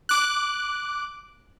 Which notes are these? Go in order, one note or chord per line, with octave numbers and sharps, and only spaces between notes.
D6 F#6